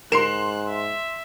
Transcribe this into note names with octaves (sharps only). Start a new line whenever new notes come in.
G#2 A#4 C6 F#6 C7 E7
E5